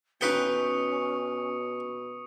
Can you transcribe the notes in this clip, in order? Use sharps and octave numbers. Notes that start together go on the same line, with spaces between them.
B2 C#4 D#4 B4 G5 C#6 D#6 C#7